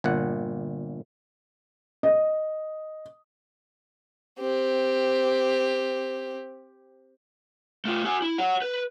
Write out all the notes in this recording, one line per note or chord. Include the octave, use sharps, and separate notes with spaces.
G1 A#2 F#5
D#5
C4 G4
A3 F4
F#4 G#5
E4
C#5 F#5
B4